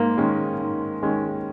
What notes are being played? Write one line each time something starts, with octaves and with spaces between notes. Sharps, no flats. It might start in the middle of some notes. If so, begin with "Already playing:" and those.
Already playing: G#2 A#3
D#3 G#3 C#4
G#2
D#3 G#3 C#4